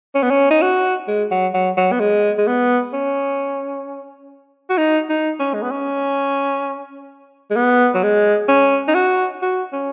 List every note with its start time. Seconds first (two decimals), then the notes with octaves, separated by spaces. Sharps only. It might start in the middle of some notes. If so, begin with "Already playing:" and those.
0.15 C#4
0.23 B3
0.30 C#4
0.50 D#4
0.62 F#4
1.08 G#3
1.31 F#3
1.54 F#3
1.77 F#3
1.92 B3
2.00 G#3
2.38 G#3
2.47 B3
2.93 C#4
4.69 F#4
4.78 D#4
5.09 D#4
5.40 C#4
5.54 G#3
5.62 B3
5.71 C#4
7.50 G#3
7.56 B3
7.94 F#3
8.03 G#3
8.48 C#4
8.88 D#4
8.95 F#4
9.42 F#4
9.73 C#4